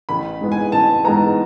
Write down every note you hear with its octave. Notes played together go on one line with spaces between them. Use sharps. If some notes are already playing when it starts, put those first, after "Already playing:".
A1 B5
G#2 E3 G#3 B3
G#5
A1 A5
G#2 E3 G#3 B3 A#5